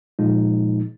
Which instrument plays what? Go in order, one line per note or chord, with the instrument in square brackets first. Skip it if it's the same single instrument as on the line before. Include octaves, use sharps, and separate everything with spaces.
[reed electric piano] A#2 F3 G#3 D#4